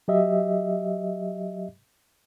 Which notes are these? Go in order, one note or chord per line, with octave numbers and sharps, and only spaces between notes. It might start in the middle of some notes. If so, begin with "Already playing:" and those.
F#3 G4 D#5 E5